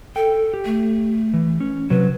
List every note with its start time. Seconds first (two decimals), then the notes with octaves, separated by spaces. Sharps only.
0.16 A4 G5
0.54 G4
0.65 A3
1.34 E3
1.60 C#4
1.90 C3 F#3 B4